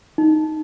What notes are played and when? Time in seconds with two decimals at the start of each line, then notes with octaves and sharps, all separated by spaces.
0.18 D#4